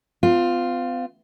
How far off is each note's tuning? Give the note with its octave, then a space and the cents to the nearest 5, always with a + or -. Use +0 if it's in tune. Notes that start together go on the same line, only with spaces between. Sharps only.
C4 -45 F4 +0